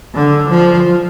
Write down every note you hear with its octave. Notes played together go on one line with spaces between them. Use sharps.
D3
F3